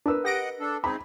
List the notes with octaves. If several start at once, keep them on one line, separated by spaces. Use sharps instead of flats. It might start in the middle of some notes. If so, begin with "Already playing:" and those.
D4 A#4 B4 E6
G4 D#5 F#5 D#6 A#6 D7
D4 A4
C4 D#4 G#4 B5